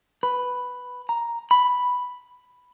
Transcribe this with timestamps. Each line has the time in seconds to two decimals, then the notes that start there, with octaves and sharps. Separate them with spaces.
0.23 B4
1.09 A#5
1.51 B5